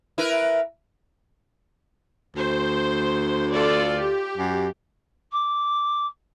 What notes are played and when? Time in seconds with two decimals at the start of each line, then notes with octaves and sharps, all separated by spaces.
0.18 E4 A#4 B4
2.36 D2 C5
3.52 F4 A4 D5
3.98 G4
4.38 F#2
5.32 D6